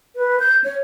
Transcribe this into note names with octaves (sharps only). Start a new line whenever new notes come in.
B4
G6
C#5